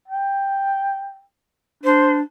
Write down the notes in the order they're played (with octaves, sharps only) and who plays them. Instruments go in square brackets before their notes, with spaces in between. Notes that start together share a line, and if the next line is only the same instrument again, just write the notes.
[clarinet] G5
[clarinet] D4 [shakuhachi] C5